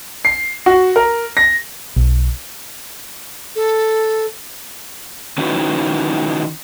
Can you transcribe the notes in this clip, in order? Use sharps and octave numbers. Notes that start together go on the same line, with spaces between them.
C7
F#4
A#4
A#6
B1
A4
D#3 C#4 D#4 E4 F#4 B4